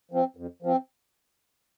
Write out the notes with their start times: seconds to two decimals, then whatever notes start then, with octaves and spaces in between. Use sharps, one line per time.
0.11 F3 C4
0.37 F2
0.62 F3 C4